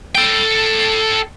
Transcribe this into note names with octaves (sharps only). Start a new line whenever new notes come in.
A4 G5